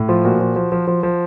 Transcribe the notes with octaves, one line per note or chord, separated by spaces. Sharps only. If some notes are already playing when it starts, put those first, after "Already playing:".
Already playing: A2
F3 F4
A#2 F#4
F3
F3
F3
F3
F3